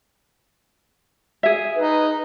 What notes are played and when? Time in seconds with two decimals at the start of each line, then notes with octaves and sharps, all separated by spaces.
1.43 G#4 E5
1.76 D#4 B4